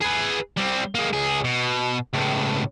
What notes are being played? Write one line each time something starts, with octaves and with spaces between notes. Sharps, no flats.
G#4 B4
G3 C4
G#3 A#3
C#2 G#4
B2
C#2 A2